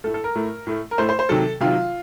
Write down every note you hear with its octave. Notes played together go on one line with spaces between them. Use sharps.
A2 A3 A4
A4
A#4
A2 A3
A2 A3
A#4
A2 A3 C5
C5
C5
C3 D#3 F#3 A4
C3 D#3 F#3 F4